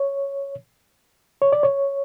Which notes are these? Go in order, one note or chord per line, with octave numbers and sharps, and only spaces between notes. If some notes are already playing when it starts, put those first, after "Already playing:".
Already playing: C#5
C#5
D5
C#5